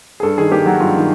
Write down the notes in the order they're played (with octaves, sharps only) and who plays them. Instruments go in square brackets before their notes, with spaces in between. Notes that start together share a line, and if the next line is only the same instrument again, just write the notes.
[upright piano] G#4
G2 A4
D#3 G#4
A#3 G4
F#3 F#4
G2 F4
D#3